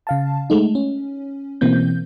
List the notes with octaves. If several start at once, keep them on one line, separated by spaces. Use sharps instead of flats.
C#3 F5 A5
G#3 A3 D#4
C#4
B2 E3 A#3 C4 G6